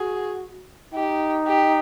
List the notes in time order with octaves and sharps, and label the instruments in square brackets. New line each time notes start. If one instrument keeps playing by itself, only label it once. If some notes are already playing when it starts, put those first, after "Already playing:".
Already playing: [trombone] F#4 [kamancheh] G#4
[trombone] D#4 [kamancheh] G4
[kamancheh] G4